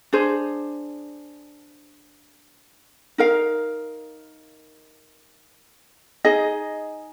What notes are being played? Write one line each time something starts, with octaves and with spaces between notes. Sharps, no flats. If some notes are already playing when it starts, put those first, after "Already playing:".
D4 G#4 C5
D#4 A#4 F5
D#4 G#4 D#5